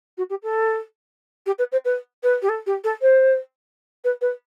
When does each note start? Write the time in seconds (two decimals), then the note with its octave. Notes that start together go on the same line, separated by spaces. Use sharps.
0.17 F#4
0.30 G4
0.43 A4
1.46 G4
1.58 B4
1.72 C5
1.85 B4
2.23 B4
2.42 G4
2.49 A4
2.66 G4
2.84 A4
3.02 C5
4.04 B4
4.21 B4